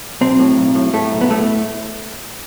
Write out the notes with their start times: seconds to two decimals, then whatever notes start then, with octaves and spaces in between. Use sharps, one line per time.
0.21 B1 C4
0.39 A2
0.57 B1
0.75 A2
0.93 A2 A3
1.12 B1
1.21 B3
1.30 A2 A3